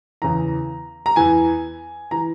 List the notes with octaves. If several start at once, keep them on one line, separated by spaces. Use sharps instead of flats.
E2 C#3 E3 A#5
A#5
E2 E3 G#5
E3 A#5